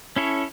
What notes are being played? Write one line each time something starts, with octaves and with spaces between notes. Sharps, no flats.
C#4 E4 A4 C#5